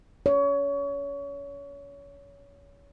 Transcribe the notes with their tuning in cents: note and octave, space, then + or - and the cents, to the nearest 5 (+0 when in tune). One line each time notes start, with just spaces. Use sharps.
C#5 +25